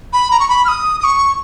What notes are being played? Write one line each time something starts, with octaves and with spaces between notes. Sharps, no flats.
B5
A#5
C#6
B5
F6
D#6
D#6
C#6